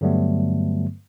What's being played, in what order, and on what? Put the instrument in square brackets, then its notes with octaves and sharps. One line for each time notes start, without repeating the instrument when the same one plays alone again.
[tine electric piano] G2 D3 F#3 G3 A3 B3